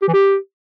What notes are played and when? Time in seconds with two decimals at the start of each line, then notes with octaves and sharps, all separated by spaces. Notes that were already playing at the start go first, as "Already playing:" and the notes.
0.02 G4
0.08 E3
0.14 G4